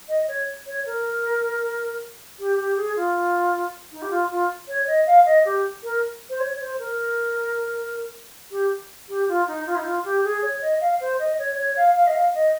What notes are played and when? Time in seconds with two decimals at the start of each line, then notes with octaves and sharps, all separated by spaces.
0.08 D#5
0.28 C#5
0.66 C#5
0.86 A#4
2.39 G4
2.58 G4
2.76 G#4
2.96 F4
3.91 D#4
4.02 G4
4.10 F4
4.30 F4
4.68 C#5
4.87 D#5
5.06 F5
5.25 D#5
5.45 G4
5.83 A#4
6.29 C5
6.40 C#5
6.60 C5
6.78 A#4
8.51 G4
9.08 G4
9.28 F4
9.47 D#4
9.66 F4
9.76 D#4
9.85 F4
10.04 G4
10.24 G#4
10.42 C#5
10.61 D#5
10.80 F5
11.00 C5
11.19 D#5
11.38 C#5
11.57 C#5
11.76 F5
11.95 F5
12.07 D#5
12.14 F5
12.34 D#5